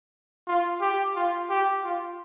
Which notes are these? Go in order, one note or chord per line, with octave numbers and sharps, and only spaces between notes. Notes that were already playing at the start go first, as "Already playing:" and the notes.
F4
G4
F4
G4
F4